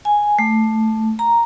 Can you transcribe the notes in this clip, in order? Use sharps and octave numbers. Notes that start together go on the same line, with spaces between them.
G#5
A3
A#5